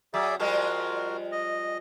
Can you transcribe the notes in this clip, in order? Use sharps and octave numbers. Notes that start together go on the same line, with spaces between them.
F#3 G#4 D5 E5
F3 G3 G#3 F#4 A#4
D#5